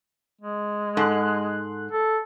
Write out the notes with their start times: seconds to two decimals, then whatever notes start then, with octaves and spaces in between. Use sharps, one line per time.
0.41 G#3
0.97 G#2 A4 C6 F#6
1.92 A4